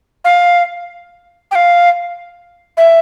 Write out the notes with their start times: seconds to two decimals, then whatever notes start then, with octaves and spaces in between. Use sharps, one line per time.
0.25 F5
1.51 G5
1.55 F5
2.77 E5